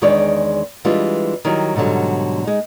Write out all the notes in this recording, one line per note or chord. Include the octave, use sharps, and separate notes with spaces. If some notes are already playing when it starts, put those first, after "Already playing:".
E2 D#3 G#3 D4 C#5 D5
E3 G3 G#3 D4 F4
D#3 F#3 G3 E4
G#2 B2 D3 F#3 G3
G#3 D#4